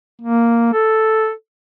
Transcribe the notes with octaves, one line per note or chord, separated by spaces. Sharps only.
A#3
A4